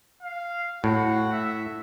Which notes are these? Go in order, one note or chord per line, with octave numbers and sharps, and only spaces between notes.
F5
A2 F#4
E5